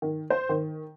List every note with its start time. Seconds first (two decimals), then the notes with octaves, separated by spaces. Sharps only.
0.02 D#3
0.30 C5
0.49 D#3